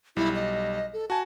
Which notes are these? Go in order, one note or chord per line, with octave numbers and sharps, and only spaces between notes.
B1 G3 E4
D#5
A4
F#4 G#5 A5